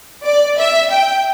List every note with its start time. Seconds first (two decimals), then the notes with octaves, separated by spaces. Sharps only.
0.24 D5
0.58 E5
0.91 G5